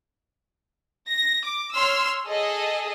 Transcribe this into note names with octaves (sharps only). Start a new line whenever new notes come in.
A#6
D6
C#5 C6 E6 F6
G#4 A4 D#5